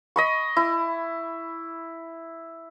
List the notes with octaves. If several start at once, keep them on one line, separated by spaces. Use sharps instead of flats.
D#5 B5 C#6
E4